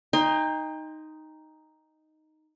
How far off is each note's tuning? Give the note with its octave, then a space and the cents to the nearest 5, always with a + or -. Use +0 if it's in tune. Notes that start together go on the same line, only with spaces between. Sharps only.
D#4 +0 G5 +35 C6 +0